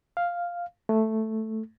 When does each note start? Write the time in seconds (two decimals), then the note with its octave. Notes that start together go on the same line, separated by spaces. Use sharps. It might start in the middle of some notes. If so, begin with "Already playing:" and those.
0.17 F5
0.89 A3